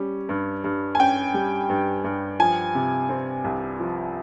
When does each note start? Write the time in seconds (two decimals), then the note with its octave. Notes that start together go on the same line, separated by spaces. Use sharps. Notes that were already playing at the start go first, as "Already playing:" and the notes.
Already playing: G3 C#4
0.29 G2
0.64 G2
0.95 G#5
0.99 C#4 G5
1.34 G3
1.70 G2
2.04 G2
2.39 F3 G#5
2.75 C3
3.09 C4
3.44 C2
3.80 F3